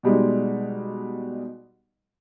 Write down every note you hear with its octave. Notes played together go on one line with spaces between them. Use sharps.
B2 G3 G#3 D#4